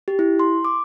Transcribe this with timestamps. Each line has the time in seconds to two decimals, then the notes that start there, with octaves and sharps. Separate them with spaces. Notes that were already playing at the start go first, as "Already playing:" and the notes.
0.08 G4
0.19 E4
0.39 C6
0.65 D6